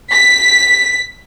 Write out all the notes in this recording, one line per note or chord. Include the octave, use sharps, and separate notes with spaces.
B6